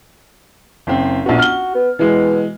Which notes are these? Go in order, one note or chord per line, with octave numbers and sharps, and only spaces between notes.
F#1 C4
A#1 B3 F#4
F6 G7
B3
B2 E3 G#3